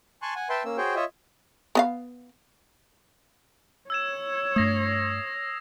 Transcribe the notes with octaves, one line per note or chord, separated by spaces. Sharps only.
G#5 A5 C6 C#6 F#6
F#5 G#5
B4 E5 G5 A5 C6
A#3 C#4 E6
F#4 G#4 C5 C#5 G5
F4 C#5 D#5 E5
B3 D#5 F5
C#5 E6 G#6 E7
G2 A3 D#6 A#6 C7